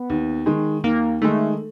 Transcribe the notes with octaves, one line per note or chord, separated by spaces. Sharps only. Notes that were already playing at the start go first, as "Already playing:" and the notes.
Already playing: B3
D#2
D#3 G#3
D#2 A#3
D#3 G#3 A3